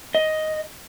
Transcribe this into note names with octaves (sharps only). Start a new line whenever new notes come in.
D#5